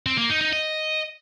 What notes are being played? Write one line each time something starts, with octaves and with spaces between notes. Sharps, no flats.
C4
A#3
D#4
D#4
D#5